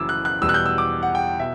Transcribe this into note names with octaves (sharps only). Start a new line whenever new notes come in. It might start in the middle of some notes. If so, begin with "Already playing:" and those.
Already playing: F#1 F#2 E3 D6 E6
F#6
F#6
E2 B2 G3 E6
F#6
G6
E6
D6
F#5
G5
B2 E5